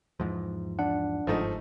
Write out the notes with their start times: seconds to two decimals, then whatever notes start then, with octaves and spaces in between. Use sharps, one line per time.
0.20 E2 G#2 F3
0.79 D4 F#5
1.27 G1 G#2 F3 A3 D#4